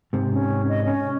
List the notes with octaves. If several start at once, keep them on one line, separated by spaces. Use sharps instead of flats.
G#2 C3
C#4
D#5
C#4